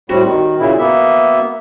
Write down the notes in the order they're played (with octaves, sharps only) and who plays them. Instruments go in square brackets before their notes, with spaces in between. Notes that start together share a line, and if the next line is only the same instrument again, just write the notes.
[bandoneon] A2 G3 C4 [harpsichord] F#4
[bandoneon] D#3
A#2 C#3 E4
A#3 B3 E5